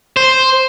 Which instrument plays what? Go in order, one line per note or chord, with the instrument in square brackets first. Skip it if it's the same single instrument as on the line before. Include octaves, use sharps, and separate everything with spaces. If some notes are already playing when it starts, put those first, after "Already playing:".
[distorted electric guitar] C5